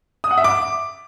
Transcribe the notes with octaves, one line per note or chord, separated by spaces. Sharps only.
D#6
F#5
E5
D6